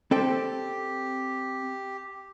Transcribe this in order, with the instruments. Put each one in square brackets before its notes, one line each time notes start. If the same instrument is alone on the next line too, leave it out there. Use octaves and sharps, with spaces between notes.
[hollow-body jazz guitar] C4 A4 G5 [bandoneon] G4